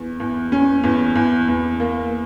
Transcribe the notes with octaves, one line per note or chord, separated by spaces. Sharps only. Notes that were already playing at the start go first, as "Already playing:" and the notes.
Already playing: E2
E2
C#4
E2
E2
E2
A#3